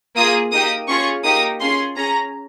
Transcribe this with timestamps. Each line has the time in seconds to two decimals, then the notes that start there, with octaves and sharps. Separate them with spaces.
0.16 A#3 F4 G#4 D#6
0.52 A#3 D#4 G4 D#6
0.88 C#4 F4 G#4 C#6
1.24 A#3 D#4 G4 D#6
1.61 C#4 F4 G#4 C6
1.97 C#4 G#4 A#5